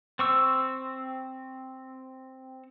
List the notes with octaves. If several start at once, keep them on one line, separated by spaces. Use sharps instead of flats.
C4 C#6 E6